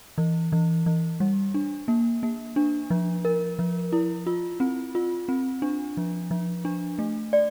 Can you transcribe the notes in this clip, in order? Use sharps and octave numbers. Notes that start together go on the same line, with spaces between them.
E3
E3
E3
G3
D4
A#3
A#3
D4
F3
A#4
F3
E4
F4
C4
F4
C4
D4
F3
F3
D4
A3
D5